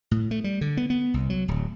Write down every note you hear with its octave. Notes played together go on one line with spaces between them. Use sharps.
A2
A3
G3
D3
B3
B3
C2
F#3
D1